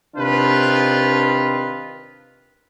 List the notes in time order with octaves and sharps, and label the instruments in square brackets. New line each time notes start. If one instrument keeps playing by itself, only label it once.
[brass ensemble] C3 D#3 D4 F4 B4